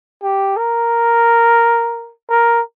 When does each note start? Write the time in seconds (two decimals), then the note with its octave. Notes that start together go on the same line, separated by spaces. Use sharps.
0.23 G4
0.57 A#4
2.30 A#4